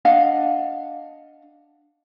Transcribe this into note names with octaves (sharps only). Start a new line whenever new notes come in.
D4 D#5 F5 F#5